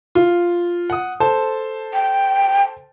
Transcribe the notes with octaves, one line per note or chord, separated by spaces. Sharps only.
F4
F#5 D#6
A4 C5 A5
G5